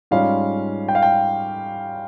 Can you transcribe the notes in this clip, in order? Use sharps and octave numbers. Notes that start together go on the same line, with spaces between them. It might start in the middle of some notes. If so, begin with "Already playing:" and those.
G#2 G3 C#4 F4 F5
G5
F5
G5